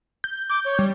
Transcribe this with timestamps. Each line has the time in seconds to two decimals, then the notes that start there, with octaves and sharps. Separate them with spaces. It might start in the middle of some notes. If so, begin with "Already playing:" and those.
0.24 G6
0.50 D6 G6
0.65 C#5
0.79 G3